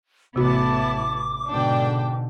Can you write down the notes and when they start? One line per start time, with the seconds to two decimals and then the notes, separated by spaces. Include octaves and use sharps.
0.36 A1 C3 B3 E4 F#4 A5 D6
1.51 G#2 B2 D3 D4 G5